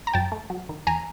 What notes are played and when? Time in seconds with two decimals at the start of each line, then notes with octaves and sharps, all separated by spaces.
0.07 A#5
0.14 F#2 G5 A5
0.32 A3
0.50 F#3
0.69 D#3
0.87 E2 G#5 A#5